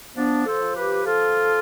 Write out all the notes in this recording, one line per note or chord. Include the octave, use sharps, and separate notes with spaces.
F3 B3 D4
A4 C5
F3
G4 B4
F3 F4 A4